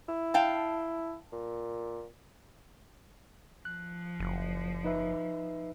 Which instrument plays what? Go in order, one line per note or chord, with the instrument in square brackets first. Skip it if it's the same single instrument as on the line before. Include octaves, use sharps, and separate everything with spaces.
[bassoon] E4
[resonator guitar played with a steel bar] F5 G5 A5
[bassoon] A#2
[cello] F3 [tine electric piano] F#6
[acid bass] F#1
[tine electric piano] D#4 B4 E5